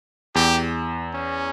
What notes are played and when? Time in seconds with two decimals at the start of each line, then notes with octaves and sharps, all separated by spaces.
0.35 E2 G4
1.14 C#4